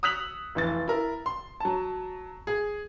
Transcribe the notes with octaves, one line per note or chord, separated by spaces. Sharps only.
D#6 E6 F#6 B6 F7 F#7
F1 E3 A6
E4 A#4
C6
F#3 A5
G#4